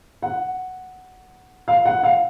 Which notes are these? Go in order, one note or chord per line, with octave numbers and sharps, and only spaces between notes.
F#5
F5
F#5
F5